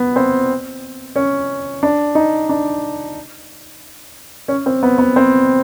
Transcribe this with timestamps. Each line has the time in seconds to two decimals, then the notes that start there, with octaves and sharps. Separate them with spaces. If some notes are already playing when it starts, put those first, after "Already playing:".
Already playing: B3
0.16 C4
1.16 C#4
1.83 D4
2.15 D#4
2.49 D4
4.48 C#4
4.66 C4
4.83 B3
4.98 B3
5.16 C4